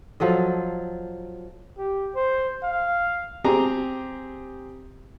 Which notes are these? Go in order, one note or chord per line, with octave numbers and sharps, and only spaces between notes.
F3 F#3 A4 D#5
G4
C5
F5
C4 G4 G#4 A#5